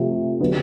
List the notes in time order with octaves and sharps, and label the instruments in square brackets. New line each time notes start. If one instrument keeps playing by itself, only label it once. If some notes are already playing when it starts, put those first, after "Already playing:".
Already playing: [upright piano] C3 F3 A3
D3 F#3 B3